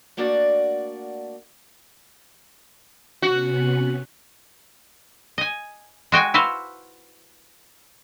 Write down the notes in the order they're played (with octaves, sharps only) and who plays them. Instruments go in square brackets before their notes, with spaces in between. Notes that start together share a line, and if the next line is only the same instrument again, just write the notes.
[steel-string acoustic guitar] A3 A#3 D4 F#4 D5 F#5
[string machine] C3 B3 C#4 [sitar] F#4
[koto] D#5 G#5
G#3 F#4 G5 G#5
E4 F#4 B4 C5 F5